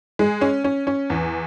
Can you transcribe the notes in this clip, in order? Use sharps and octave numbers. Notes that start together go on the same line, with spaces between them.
G#3
C#4
C#4
C#4
E2